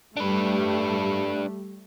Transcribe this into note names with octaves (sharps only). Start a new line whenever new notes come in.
G3 A3 D4 B4